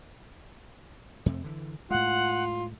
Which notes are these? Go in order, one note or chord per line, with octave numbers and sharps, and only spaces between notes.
F2 C3 A3
D3 E3
A2 G#3 F4 F#5